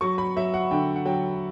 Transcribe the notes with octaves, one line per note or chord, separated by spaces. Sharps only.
F#3 C#6
B5
F#3 E5
F#5
D3 G5
F#5
F#3 G5